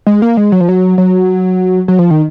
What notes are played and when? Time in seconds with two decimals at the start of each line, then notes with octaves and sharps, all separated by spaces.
0.07 G#3
0.22 A#3
0.37 G#3
0.52 F#3
0.60 F3
0.69 F#3
0.98 F#3
1.88 F#3
1.99 F3
2.10 D#3